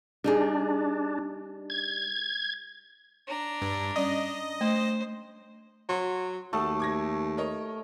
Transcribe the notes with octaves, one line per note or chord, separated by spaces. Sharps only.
G3 D4 D#4 G#4
G#6
D4 A#5
G2
G3 C#4 D5 D#5
A3 C5
F#3 C6
D#2 A3 F#4 A5 D#6
D6 G#6 A#6
A#4 C#5 D#5